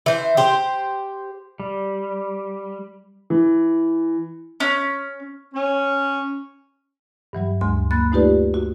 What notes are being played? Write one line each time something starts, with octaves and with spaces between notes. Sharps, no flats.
E3 C5
G4 C5
G3
E3
C#4
C#4
G2 E3 F#3 G3
D2 G#3 C6
A#3 B5 F#6 A6
A3 D#4 F4 G4 B4 D5
F#4